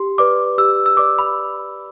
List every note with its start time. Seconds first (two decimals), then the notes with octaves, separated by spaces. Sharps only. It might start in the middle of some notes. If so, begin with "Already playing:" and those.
Already playing: G4 C6
0.18 B4 D5 D6
0.58 G4 E6
0.86 E6
0.97 B4 D5 D6
1.19 B5